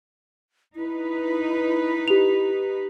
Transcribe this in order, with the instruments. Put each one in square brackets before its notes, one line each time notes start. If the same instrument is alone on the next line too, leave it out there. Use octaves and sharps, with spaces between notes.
[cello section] D#4 B4 [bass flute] E4
[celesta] G4 F7